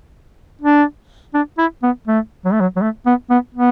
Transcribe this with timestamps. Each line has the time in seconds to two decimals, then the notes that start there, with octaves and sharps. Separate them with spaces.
0.61 D4
1.34 D4
1.58 E4
1.83 B3
2.08 A3
2.45 F#3
2.53 A3
2.60 F#3
2.76 F#3
2.82 A3
3.06 B3
3.30 B3
3.55 B3